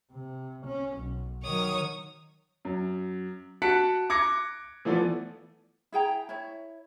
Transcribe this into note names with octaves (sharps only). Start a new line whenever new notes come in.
C3
C#4
B1
D#3 F#3 C#5 D#6
F#2
F#4 A5 F#6 B6 C#7 D7
D6 G#6 A#6 C#7
E3 F3 A3 B3 A4 D5
E4 G#4 G5 A#5
E4 C#5